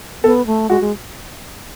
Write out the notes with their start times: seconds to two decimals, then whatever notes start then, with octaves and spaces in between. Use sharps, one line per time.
0.24 B3 A4
0.47 A3
0.70 G#3 F#4
0.81 G#3